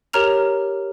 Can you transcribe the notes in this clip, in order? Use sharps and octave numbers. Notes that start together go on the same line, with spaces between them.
G4 A#4 C#5 A#5 F6 F7